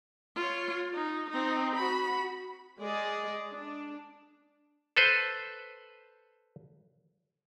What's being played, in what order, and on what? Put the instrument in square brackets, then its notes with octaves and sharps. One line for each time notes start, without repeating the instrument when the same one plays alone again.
[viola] F4 C#5
D#4
C4 D#4
F#4 B5
[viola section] G#3 G#4 D5 D#5
D4
[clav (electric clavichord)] A4 B4 C5